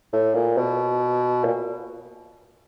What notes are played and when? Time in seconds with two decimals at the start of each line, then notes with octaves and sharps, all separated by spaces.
0.13 A2
0.35 A#2
0.57 B2
1.44 A#2